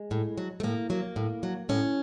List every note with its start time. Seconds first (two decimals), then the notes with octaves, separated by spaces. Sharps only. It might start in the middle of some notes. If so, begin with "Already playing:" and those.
Already playing: G#3
0.11 A2
0.38 F#3
0.60 A3
0.63 A2 A#3
0.90 F#3 A#3
1.16 A2
1.43 F#3
1.69 A2 C#4